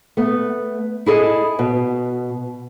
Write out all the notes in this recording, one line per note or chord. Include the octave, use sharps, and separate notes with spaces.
A3 B3
E4 G#4 A4 D#5
B2